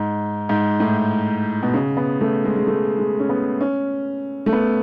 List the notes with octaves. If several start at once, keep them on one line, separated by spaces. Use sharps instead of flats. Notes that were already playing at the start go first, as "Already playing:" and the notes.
Already playing: G#2
G#2
A2
B2
C#3
B3
A3
G#3
G#3
A3
G#3
C#4
B3
C#4
A3
B3